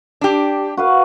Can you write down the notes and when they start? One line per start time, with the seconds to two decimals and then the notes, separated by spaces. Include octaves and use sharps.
0.21 D4 G4
0.77 F#4 B4 F5